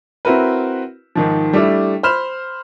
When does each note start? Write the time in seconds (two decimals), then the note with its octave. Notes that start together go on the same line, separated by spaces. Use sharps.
0.25 C4 E4 F#4 A#4 B4
1.15 G#2 D#3 F3
1.53 G3 A3 D4 E4
2.03 C5 B5 F6 E7